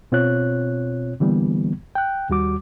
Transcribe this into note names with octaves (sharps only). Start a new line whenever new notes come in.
B2 C4 F4 C#5 F#6
D3 E3 G3 A#3 B3
G5 F#6
D#2 G3 F#4 D6